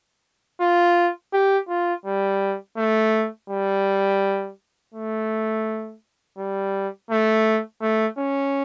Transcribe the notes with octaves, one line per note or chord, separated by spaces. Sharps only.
F4
G4
F4
G3
A3
G3
A3
G3
A3
A3
C#4